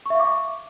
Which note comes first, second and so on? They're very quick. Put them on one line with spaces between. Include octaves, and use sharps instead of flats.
C#6 E5 F5 D6